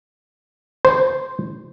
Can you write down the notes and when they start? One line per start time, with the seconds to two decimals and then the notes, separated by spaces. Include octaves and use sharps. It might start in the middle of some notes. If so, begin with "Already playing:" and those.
0.85 C5